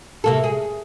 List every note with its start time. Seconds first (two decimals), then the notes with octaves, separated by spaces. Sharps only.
0.24 C3 A#3 A4
0.44 G#4